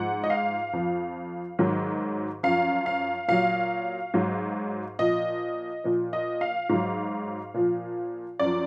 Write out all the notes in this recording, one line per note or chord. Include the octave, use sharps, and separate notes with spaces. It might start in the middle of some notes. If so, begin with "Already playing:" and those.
Already playing: G#2 F3 F#5
D#5
F5
F2 F3
G#2 D#3 F#3
F#2 F3 F5
F5
A#2 F#3 F5
G#2 F#3
A#2 F3 D#5
A#2 F3
D#5
F5
G#2 F#3
A#2 F3
F#2 F3 D5